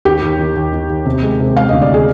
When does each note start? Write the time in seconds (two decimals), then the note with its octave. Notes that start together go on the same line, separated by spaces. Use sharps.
0.05 D#2 G4
0.22 D#2
0.39 D#3
0.56 D#2
0.73 D#3
0.89 D#2
1.06 C3
1.23 G#3
1.40 C3
1.56 G#3 F5
1.69 D2 D#5
1.82 D5
1.94 G#4